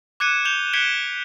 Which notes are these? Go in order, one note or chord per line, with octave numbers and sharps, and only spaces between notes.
D6 F#6 G#6 C#7 D#7 E7
G6 F7 G7
F#6 G#6 B6 C#7 D7 G7